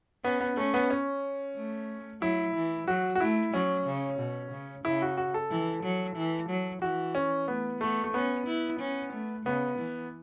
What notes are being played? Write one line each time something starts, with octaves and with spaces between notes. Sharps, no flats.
B3 C#4
B3
A3 C#4
B3
C#4
A3
F#3 E4
E3
F#3 F#4
F#4
A3 E4
F#3 C#4
C#3
B2
C#3
C#3 E4
F#4
F#4
A4
E3
F#3
E3
F#3
E3 F#4
C#4
A3 B3
A3 B3
A3
B3 C#4
E4
C#4
A3
C#3 B3
E3